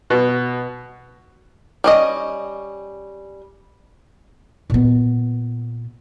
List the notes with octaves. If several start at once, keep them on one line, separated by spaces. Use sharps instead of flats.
B2
G3 C#4 D#5
A#2 B3